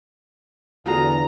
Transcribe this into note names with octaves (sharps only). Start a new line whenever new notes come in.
E2 D3 F4 F#4 G#4 A#5